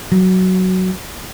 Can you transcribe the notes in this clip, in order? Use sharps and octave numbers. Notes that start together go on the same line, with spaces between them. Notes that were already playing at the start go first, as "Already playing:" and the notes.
F#3